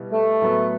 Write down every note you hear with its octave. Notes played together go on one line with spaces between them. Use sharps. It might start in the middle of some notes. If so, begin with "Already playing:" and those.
Already playing: B2 G3 B3 E4
A3
A2 F#3 B3